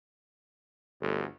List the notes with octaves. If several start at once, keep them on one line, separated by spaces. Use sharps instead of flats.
G1 D2